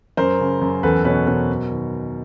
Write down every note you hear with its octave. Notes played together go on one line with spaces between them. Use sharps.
F#2 A#4 C5
C#3
F#2
E2 A4 B4
B2 B4 C#5
B2 A#4 C5
F#2
D#3